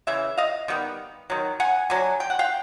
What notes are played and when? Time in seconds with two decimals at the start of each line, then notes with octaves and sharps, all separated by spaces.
0.07 C#3 E3 E5
0.37 D#5 F5
0.68 D#3 G3 B3
1.30 D#3 F#3
1.60 F#5 G#5
1.90 D3 F#3 G#5
2.20 G5
2.30 F#5
2.39 F5 G5